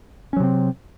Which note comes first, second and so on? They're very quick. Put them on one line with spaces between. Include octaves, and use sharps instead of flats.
C#4 F#3 C3 C4